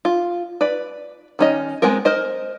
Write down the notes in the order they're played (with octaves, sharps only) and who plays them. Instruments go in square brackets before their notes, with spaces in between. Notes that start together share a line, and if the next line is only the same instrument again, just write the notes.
[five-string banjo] F4
B4 D5
D#3 C#4 D#5
G#3 B3 C4 A#4
A#4 C5 D#5